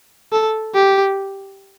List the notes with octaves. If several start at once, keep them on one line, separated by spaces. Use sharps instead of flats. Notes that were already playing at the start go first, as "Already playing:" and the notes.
A4
G4